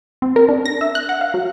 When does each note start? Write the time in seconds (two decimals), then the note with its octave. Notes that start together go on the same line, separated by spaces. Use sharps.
0.22 C4
0.36 A#4
0.49 D4
0.66 A#6
0.81 E5
0.95 F#6
1.09 F#5
1.21 F5
1.34 F#3